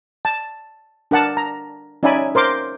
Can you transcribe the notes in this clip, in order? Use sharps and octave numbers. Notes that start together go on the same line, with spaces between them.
A5
D4 A#4 F#5 A5
A#5
C#4 D#4 D5 E5 G#5 B5
A#4 C5 C6 D6